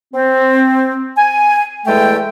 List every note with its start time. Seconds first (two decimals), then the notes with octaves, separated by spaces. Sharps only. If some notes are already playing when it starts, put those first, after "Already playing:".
0.14 C4
1.17 G#5
1.86 E2 G#3 A3 A4 G5